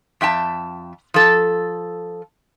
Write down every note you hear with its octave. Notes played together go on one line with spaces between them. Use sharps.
F2 E5 G5 A5
F3 A4